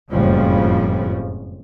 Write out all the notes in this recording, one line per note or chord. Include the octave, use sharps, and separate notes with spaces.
F#1 F2 A2 C#3 F3 G3